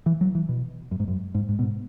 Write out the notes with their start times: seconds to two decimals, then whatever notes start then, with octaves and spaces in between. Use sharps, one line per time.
0.06 E3
0.21 F#3
0.35 E3
0.49 B2
0.91 F#2
1.00 G#2
1.08 F#2
1.35 G#2
1.49 G#2
1.59 B2
1.63 G#2